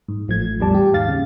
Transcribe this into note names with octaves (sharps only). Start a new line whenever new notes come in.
G#2
A1 F3 A3 G#6
A#1 E2 A2 G3 D5 A5
G4
D#2 G#2 F5 A6
C#3